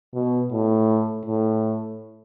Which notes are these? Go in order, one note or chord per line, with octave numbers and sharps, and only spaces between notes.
B2
A2
A2